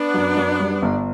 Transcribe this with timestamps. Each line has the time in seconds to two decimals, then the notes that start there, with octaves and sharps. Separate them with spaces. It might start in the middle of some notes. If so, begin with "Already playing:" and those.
Already playing: B3 D4
0.14 F#2
0.37 F#2
0.60 G3
0.82 G1